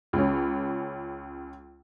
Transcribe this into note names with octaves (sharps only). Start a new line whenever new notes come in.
C#2 C#4